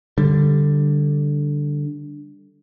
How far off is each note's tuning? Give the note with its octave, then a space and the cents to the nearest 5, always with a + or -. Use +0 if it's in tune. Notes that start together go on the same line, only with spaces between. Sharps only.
D3 +0 G3 +5